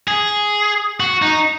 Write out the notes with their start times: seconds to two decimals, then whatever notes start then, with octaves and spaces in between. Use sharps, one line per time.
0.08 G#4
1.00 F#4
1.22 D#4